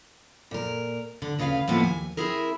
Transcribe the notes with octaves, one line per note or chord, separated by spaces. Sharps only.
A#2 A#4
D3
D2 C#3 B4 E5 F5
A2 F3 A#3 B3
D#2 G#5
C4 E4 G#4 A#4